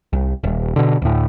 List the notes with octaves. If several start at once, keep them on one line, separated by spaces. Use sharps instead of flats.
C2
D#1
B2 D3
D2 A2